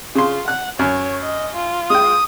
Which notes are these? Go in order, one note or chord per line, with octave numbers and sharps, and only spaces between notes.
C#3 F4 C6
F#5 F#6
F#2 C#5
D#5
F4
G#3 G5 D#6